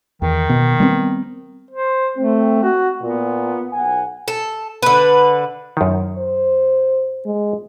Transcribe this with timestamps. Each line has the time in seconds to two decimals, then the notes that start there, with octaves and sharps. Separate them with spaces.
0.22 E2 D#3
0.49 B2
0.80 G3 B3 C4
1.71 C5
2.17 A3 C4
2.64 F#4
3.02 A#2 B3
3.73 B1 F#5 G#5
4.28 A4
4.82 D3 B4
5.77 F#2 D#3
6.18 C5
7.26 G#3